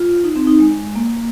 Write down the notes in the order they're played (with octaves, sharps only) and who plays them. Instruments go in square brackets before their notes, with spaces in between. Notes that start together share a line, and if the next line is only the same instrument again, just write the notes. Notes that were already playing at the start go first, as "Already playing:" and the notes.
Already playing: [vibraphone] F4
D#4
C4
D#4
G#3
A#3